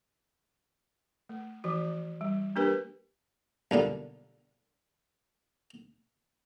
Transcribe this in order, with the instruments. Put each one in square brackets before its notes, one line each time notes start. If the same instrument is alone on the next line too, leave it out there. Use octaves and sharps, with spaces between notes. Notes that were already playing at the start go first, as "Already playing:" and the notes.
[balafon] A3
E3 F3 F#4
G3
A#3 D4 G4 A#4 B4
[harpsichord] B1 A#2 D3 G3